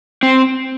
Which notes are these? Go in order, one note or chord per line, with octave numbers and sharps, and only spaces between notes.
C4